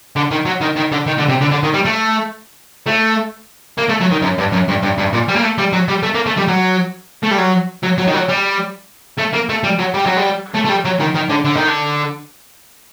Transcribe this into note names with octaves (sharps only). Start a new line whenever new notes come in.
D3
D#3
F#3
D#3
D#3
D3
D#3
D3
C3
D3
D3
D#3
G3
A3
A3
A#3
A3
F#3
D#3
F#2
G2
F#2
G2
G2
G2
A#2
G3
A#3
A3
G3
F#3
G3
A3
A#3
A3
G3
F#3
A3
G3
F#3
F#3
F#3
D#3
F#3
G3
A3
A#3
A3
G3
F#3
G3
F#3
G3
A3
A3
G3
F#3
D#3
D#3
D3
D3
D#3
D3